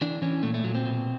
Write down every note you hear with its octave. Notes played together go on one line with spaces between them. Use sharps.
E3 D4
E3 C#4
A#2 A3
A3
A#2 F#3
C4
B2